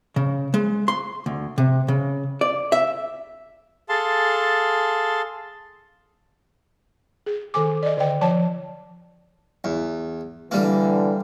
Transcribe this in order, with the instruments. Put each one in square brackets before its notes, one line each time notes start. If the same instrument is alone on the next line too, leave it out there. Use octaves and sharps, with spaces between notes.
[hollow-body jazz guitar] C#3
G#3
C6
D2
C3
C#3
D5
E5
[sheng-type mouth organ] G#4 A4 F5 A5 C6
[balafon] G#4
D#3 A4 G#5 D6
D5 D#5
D3 D5 G5
F3 C#5 A5
[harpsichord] E2
[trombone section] D3 E3 [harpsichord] G3 A#3